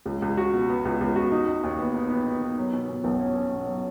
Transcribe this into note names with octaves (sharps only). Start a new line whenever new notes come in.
C#2
C#2
F#4
B2
B3
C#2
C#2
F#4
D#4
D#4
D#2
B3
D#4
B3
D#4
B3
F#3
B2
B2
B1
C#4
C#4
B2
F#3